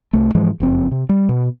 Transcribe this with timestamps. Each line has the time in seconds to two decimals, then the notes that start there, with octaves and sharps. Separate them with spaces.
0.13 C2 A3
0.35 G#2 E3 F3 G#3
0.60 F#1 F2 C4
0.91 C3
1.09 G3
1.29 B2